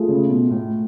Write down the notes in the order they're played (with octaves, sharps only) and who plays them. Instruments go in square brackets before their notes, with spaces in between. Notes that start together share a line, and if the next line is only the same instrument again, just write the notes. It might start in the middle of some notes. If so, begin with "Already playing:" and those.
Already playing: [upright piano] A3 F4 G#4
[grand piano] C#3
B2
A2